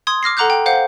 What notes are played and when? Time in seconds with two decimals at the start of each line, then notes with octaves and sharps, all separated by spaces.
0.07 C6 D#6 G#6
0.23 D6 F6 A#6 C7
0.37 A4 F#5 A#5 D6 F#6 G6
0.50 G5
0.66 C5 F5 F#5 G6